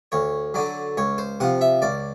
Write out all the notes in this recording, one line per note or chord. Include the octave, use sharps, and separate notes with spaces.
D2 C#5
D3 F#3 D5
C#2 C#5
C5
C3 F3 F#5
E5
C#2 D5